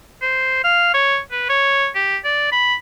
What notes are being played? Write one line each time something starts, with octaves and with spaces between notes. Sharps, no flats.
C5
F5
C#5
B4
C#5
G4
D5
B5